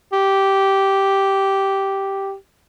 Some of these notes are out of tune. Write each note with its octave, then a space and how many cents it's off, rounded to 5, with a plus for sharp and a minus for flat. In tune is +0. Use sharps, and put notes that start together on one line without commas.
G4 -10